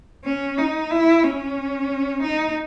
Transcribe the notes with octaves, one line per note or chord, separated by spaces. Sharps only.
C#4
D#4
E4
C#4
D#4